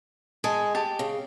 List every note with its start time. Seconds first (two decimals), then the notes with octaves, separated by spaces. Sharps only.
0.44 G#3 D#5 G#5 A5
0.75 G4 A5
0.99 C#3